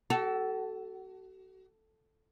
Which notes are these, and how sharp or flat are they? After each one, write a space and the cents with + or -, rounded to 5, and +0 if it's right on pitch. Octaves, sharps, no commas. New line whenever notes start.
F#4 +35 A4 +0